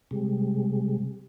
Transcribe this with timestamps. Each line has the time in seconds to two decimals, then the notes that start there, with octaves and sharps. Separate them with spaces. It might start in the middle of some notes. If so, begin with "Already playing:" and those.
0.11 C3 G3 G#3